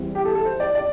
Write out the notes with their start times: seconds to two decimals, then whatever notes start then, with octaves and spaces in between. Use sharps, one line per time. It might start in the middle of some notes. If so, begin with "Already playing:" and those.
Already playing: E2 E3 G3 C4
0.15 G4
0.25 A4
0.35 A4
0.45 C5
0.60 D5
0.75 D5